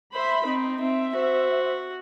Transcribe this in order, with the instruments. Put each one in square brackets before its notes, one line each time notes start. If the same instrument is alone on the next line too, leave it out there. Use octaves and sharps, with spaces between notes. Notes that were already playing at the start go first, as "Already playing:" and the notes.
[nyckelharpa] C5 [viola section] E5 B5
[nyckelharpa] C4 [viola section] D#4
[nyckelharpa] C4 [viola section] E5
[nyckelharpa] F#4 [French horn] C5